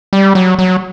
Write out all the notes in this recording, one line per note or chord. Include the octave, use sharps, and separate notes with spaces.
G3
F#3
F#3